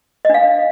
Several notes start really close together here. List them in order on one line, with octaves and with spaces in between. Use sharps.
D#5 D4 F5